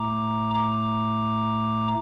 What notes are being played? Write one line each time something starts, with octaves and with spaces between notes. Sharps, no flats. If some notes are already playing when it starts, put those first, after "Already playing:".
Already playing: A2 A3 A#5 D6
A#5 D6